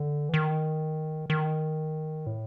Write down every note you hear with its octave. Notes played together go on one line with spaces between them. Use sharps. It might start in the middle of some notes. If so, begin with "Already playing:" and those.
Already playing: D3
E3
D#3
D#3
A2